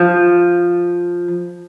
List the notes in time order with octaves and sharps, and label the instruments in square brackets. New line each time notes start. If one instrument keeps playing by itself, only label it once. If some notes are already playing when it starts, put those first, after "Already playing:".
Already playing: [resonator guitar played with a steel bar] F3